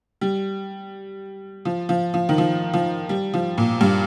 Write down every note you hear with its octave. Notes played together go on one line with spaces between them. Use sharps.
G3
F3
F3
F3
D#3
F3
F3
G3
F3
A#2
G2